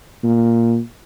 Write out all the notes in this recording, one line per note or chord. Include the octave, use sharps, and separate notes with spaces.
A#2